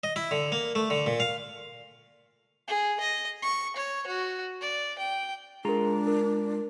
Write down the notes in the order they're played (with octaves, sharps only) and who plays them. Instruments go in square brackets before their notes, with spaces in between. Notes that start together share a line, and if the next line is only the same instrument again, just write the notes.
[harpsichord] D#5
E4
D3
A#3
A3
D3
A#2
F5
[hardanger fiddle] G#4
D#5
C#6
C#5
F#4
D5
G5
[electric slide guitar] G#3 F4 A#5 [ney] D4 [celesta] G#4 A#4
[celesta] A#4